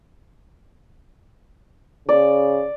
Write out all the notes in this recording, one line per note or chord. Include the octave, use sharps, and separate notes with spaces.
C#3 D5